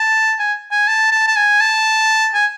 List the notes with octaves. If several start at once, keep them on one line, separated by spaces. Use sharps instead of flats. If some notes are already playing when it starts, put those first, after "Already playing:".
Already playing: A5
G#5
G#5
A5
A5
A5
G#5
A5
G#5